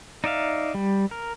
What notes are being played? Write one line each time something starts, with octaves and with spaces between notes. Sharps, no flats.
D#4 D5 E5 F5
G3
A#4